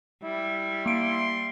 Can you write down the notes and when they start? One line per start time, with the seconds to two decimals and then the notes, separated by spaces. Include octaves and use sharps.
0.23 G3 E4
0.86 A#3 C6 D7